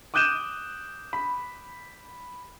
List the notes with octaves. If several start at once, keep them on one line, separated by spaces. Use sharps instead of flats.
D6 D#6 F#6 G6 D#7 E7
B5